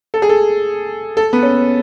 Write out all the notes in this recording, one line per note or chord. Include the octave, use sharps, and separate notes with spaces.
A4
G#4
A4
A4
B3
C#4